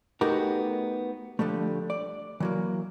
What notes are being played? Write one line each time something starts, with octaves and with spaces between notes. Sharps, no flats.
A3 B3 D#4 F#4 G4 A#4
D3 F3 G3 A3
D5
E3 F#3 A#3